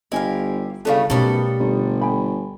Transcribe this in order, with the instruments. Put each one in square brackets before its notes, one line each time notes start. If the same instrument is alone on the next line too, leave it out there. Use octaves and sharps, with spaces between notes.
[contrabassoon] G1 [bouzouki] E4 G4 F5 [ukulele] D#5 G#5
[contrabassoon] G1 [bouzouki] C#3 A3 B3 [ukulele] A4 D5 F5
[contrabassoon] B1 [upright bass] B2 A3 [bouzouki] G3 B3 A4 [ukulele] C#4 A#4
[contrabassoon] G1
[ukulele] G5 G#5 B5